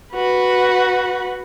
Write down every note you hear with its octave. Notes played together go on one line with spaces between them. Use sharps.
F#4 B4